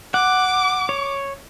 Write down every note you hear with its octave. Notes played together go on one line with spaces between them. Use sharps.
F#5 D6
C#5